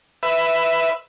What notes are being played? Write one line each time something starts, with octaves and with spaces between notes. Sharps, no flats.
B4 E5